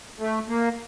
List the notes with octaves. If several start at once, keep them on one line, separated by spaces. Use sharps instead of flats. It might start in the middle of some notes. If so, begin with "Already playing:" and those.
A3
A#3